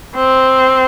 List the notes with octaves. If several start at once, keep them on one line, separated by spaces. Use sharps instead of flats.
C4